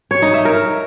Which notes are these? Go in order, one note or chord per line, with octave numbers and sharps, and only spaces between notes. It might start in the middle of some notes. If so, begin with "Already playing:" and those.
C#5
D#4
E5
A#4